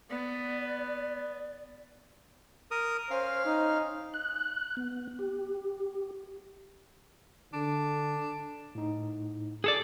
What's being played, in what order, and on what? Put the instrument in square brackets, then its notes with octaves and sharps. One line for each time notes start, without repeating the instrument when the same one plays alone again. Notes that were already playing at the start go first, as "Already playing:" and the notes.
[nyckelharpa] B3 [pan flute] D5
[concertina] A#4 D#6
[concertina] C#4 F5 [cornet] C5
[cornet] D#4
[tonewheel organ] F#6
B3
G4
[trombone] D3 [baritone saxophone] D4
[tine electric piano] A2 D#4
[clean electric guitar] G#4 A4 D5